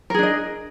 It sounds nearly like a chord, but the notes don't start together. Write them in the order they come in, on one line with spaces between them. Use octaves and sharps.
A#4 G#4 D4 D#5